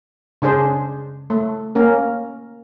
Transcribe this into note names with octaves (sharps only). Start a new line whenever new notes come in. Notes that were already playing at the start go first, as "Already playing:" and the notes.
C#3 D4 G#4 C5
A3
A#3 C#4 A#4